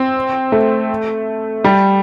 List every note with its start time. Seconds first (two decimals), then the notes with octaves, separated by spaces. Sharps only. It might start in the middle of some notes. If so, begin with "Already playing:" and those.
Already playing: C4
0.52 A3
1.64 G3